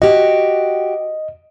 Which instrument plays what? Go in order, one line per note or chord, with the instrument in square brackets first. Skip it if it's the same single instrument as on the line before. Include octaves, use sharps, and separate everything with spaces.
[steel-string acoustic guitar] F#4 G4 [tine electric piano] D#5